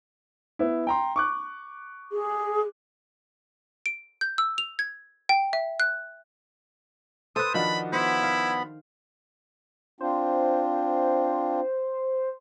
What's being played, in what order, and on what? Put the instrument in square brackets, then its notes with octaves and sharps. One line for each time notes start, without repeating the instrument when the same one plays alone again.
[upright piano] B3 E4
G5 A#5 C6
C#6 D6 F#6
[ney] G#4
[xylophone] D7
G6
E6
F7
G#6
G5
E5
F#6
[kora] A4 B4 [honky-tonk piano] C5 [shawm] D#6
[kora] D#3 [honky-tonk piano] F3 D4 F#4 [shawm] B5
[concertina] B3 B5 [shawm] E4 [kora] C5
[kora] F5
[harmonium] C4 D4 F4 [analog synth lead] C5